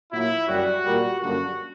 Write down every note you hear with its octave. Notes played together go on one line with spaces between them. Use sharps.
A#2 F#3 A#3 E4
F#2 C#3 G3 F#4
A#2 G3 A#3
F#2 D3 G3 A#3 F#4